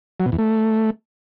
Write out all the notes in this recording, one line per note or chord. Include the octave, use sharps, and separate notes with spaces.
F#3
B2
E2
A3